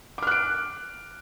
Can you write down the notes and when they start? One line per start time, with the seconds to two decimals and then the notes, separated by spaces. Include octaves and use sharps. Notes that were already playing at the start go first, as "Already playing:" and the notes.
0.18 D6
0.23 F6
0.27 F#6
0.31 D7